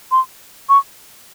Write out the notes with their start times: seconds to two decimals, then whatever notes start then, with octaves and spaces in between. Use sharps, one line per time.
0.11 C6
0.69 C#6